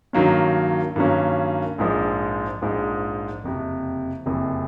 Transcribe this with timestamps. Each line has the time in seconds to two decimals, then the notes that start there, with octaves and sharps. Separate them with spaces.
0.13 G2 D#3 F#3 A#3 C#4
0.96 G2 D#3 F#3 A#3 C#4
1.78 A#1 G#2 F3 G#3
2.61 A#1 G#2 F3 G#3
3.44 F#1 F2 C3
4.26 F#1 F2 C3